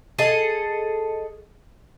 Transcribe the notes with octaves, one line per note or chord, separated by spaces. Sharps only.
G#4 A4 D#5